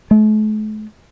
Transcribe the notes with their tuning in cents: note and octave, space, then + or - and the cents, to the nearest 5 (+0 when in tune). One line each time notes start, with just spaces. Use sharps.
A3 -45